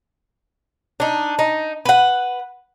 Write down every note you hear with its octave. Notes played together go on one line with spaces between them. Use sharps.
D4 D#4
D#4
B4 F#5